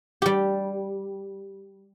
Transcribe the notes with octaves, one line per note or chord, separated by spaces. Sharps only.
G3 G4